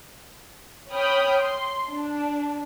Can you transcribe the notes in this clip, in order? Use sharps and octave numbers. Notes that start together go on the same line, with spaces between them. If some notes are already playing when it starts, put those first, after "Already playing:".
C#5 G5 B5 D#6 F6 G6
C6
D4